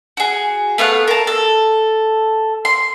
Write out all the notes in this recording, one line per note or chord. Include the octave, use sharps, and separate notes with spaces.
F#4 G#4
A3 B3 F5 F#6
A#4 A5
A4
C6